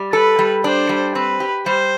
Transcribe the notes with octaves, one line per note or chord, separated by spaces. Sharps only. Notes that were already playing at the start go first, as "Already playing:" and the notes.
Already playing: G3
A4 B4
G3
D4 C5
G3
C4 B4
G4
G3 C5